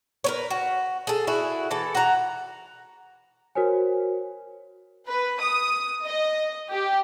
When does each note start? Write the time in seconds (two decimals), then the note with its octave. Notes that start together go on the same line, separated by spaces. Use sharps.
0.24 A#4 B4 C#5
0.50 F#4
1.07 G#4 A4
1.27 E4 F#4 G#4
1.71 E3 A4
1.95 F#4 A#5
3.55 F#4 A#4 C5 C#5 G#5
5.08 B4
5.41 D#6
6.06 D#5
6.71 G4